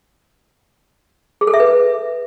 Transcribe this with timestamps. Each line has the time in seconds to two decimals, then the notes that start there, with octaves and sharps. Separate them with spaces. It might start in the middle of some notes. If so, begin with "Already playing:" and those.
1.41 G#4
1.47 A4
1.54 E5
1.60 B4